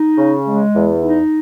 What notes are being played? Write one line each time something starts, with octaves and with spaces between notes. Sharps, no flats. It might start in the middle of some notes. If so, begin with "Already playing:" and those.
Already playing: D#4
C#3
G#3
E2
D#4